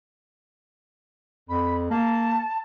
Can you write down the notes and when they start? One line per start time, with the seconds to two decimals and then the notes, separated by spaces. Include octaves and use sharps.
1.49 F2 B5
1.90 A#3 A5